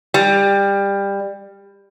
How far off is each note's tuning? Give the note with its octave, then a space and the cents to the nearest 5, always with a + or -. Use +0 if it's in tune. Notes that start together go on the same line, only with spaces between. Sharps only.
G3 +20